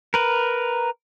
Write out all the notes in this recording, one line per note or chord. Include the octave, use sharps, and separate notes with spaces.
A#4 B4